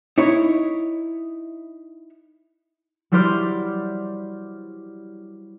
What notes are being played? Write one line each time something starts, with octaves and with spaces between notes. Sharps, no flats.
D#4 E4 C#5
F#3 G3 E4 C5 D6 F6